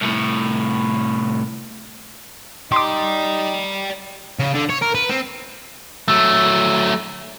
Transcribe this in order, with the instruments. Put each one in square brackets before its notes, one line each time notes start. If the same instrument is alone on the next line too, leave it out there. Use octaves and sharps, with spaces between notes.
[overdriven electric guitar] C2 A2
[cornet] D#4 [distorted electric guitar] D5 G5 [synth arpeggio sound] C6 D6
[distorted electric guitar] C#3
D3
C#5
A#4
B4
C4
[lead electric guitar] F#3 A3 [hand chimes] E6